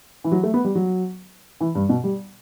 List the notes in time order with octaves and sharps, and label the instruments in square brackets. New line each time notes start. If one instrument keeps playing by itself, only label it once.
[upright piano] E3
F#3
A3
B3
G3
F#3
E3
G2
B2
G3